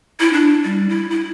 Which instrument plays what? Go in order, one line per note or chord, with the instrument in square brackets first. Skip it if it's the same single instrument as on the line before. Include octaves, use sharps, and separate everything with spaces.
[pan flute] E4
D4
G3
E4
E4